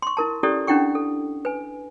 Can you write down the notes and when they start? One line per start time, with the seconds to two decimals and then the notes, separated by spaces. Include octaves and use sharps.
0.02 C6 C#6
0.17 E4 A#4 A5
0.43 C#4 E4 G4 A4 D5
0.67 C#4 D4 E4 F#5 G5 C#6
0.95 A4
1.45 B4 G#5